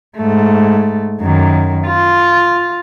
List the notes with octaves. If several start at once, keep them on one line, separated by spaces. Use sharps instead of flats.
G#2 A3
F#2 D#3
F4